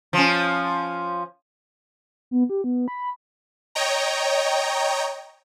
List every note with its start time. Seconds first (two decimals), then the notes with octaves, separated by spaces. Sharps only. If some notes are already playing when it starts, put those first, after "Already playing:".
0.13 F3 C#4
2.31 B3
2.50 G4
2.64 B3
2.88 B5
3.75 C#5 D#5 G5 A#5